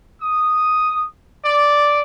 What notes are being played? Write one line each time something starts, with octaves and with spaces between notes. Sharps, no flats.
D#6
D5